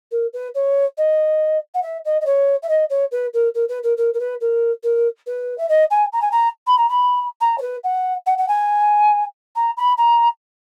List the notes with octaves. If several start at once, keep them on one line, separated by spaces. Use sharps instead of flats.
A#4
B4
C#5
D#5
F#5
E5
D#5
D#5
C#5
E5
D#5
C#5
B4
A#4
A#4
B4
A#4
A#4
A#4
B4
A#4
A#4
B4
E5
D#5
G#5
A#5
G#5
A#5
B5
A#5
B5
A#5
C#5
B4
F#5
F#5
F#5
G#5
A#5
B5
A#5